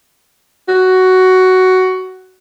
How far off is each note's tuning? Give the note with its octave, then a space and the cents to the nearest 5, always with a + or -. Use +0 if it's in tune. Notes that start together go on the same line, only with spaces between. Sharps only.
F#4 +10